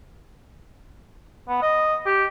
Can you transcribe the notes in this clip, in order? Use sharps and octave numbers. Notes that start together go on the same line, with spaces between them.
B3
D#5
G4